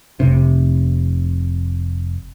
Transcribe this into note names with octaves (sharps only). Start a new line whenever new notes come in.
F1 C3